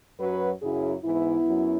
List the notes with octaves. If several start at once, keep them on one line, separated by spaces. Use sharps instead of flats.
F#2 F#3 F#4 B4
F#2 C#3 F#3 E4 G#4
G#2 E3 B3 E4
F#2 F#3